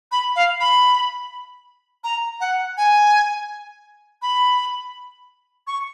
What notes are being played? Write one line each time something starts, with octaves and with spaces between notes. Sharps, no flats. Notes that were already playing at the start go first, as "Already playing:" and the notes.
B5
F5
B5
A#5
F#5
G#5
B5
C#6